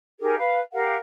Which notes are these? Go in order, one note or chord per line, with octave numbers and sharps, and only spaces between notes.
D#4 G4 G#4 A#4
B4 F5
G4 A#4 F5 F#5